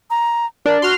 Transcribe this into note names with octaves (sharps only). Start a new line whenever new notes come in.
A#5
D4 A#4
F#4 C6 F6